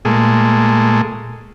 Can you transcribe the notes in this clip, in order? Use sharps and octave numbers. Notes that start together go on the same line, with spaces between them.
A#2 G#3 A3